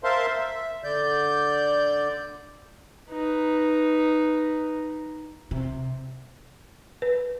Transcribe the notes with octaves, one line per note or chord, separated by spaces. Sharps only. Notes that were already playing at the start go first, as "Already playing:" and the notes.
A#4 C5 E5 F5 A5 C6
E5
D3 D5 G6
D#4 B4
C3
B4